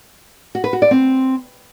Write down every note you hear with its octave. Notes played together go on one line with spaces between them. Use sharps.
F#4
B4
F#4
D5
C4